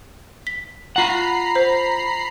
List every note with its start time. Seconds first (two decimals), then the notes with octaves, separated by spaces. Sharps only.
0.47 B6
0.96 F4 F#5 A#5 B5 C7
1.55 C5